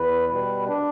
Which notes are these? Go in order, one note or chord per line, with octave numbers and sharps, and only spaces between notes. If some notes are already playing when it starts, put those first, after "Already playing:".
Already playing: E2 B4
B2 G3 B4
D4